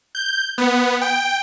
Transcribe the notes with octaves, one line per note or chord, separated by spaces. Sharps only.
G6
B3
G5